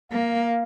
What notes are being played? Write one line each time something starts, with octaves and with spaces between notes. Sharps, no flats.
A#3 F5